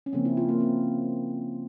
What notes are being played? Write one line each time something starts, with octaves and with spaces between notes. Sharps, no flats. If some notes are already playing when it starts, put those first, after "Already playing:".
C#4
C#3 F3 A#3 C4
E4
F4
A#3
C4